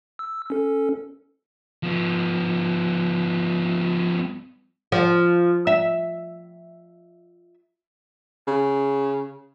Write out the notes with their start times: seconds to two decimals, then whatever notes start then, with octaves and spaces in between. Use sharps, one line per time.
0.19 E6
0.50 C#4 A4
1.83 F3 B3
4.92 F3
5.67 E5
8.48 C#3